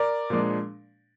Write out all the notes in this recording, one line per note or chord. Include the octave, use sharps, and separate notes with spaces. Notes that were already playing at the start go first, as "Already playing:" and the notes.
Already playing: A#4 D5
A#2 F3 G#3 D4